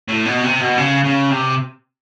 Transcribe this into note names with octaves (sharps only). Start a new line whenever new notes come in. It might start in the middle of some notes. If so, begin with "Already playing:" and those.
A2
B2
C3
B2
C#3
C#3
C3